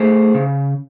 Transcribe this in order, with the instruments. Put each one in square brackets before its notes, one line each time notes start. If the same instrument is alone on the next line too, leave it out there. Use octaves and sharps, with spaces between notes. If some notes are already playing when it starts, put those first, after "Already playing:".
Already playing: [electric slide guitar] A3 G#4 C5
C#3